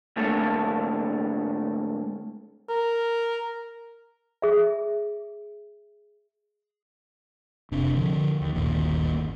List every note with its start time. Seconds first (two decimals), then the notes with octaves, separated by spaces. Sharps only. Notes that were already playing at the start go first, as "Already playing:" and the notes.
0.16 G#2 D3 A3 A#3
2.69 A#4
4.42 G#4 E5
7.71 F1 C3 D4
7.97 D3 F3
8.41 D#2
8.55 G1 D#2 A#2 D#3